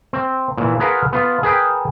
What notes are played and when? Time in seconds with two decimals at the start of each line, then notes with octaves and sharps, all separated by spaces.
0.13 C4
0.57 A#2 E3
0.80 F4 G#4 A#4 B4 F5 F#5
1.13 B3 F4
1.43 G#4 A#4 B4 G5